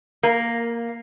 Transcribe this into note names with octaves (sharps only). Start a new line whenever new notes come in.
A#3